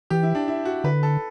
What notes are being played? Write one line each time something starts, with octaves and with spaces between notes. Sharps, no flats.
E3 G4
E4
D4
E4
F#4
D3 B4
A4